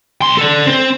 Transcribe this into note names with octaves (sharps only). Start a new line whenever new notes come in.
B1 C6
A4 D5
C4 C5